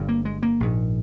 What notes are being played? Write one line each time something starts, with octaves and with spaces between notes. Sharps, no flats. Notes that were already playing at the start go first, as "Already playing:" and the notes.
Already playing: G1 G2 D3
A#3
G#3
A#3
A#1 G#2